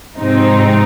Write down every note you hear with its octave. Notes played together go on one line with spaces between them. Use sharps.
G#2 C3 F3 C4 D#4